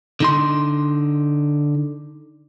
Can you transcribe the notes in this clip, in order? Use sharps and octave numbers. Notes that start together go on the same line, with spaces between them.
D3 D#4 C6